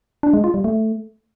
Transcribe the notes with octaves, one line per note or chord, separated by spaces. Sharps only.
D4
G#3
F4
G3
A3